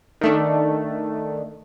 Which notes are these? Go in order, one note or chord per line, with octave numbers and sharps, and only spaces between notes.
D#3 A3 D4